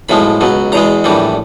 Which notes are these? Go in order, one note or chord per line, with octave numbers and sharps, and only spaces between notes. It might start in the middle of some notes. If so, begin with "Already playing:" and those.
B1 A2 F3 G#3 B5
C#2 B2 F#3
E2 B2 G#3 A#5
A#1 A2 E3 G3